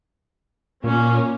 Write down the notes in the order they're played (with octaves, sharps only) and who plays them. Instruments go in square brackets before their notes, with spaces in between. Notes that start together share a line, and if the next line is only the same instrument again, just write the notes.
[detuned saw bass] A#2 [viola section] A#3 C#4